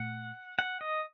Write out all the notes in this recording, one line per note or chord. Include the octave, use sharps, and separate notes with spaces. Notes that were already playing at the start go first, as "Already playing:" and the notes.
Already playing: A#2 A3 F#5
F#5
D#5